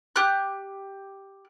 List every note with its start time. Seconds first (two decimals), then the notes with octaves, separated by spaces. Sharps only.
0.16 G4 F#6